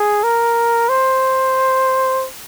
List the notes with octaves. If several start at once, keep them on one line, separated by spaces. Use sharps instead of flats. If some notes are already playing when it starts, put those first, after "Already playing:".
Already playing: G#4
A#4
C5